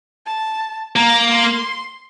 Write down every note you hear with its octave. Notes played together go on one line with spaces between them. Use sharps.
A5
A#3 A#5
C6